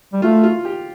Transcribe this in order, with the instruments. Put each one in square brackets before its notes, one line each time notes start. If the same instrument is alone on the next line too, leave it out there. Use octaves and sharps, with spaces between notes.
[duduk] G3
[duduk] A3 [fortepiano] F4
[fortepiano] F4
G4